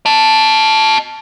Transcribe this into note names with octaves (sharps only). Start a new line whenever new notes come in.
D#5 A5